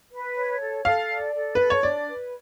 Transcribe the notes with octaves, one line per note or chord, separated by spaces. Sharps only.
B4
C#5
A4
A4 F5
D5
A4
A4 B4
C#5
D4 D5
B4